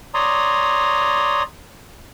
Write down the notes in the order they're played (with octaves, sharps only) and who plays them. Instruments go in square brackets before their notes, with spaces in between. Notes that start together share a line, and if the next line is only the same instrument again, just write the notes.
[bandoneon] C#5 D5 A#5 C6 D#6